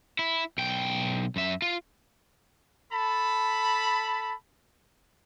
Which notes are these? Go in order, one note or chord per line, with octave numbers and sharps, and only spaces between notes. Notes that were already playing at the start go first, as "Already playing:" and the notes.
E4
B1 G5
F#2 E5
F4
A4 A5 B5